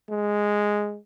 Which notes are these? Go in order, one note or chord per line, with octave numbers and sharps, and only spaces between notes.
G#3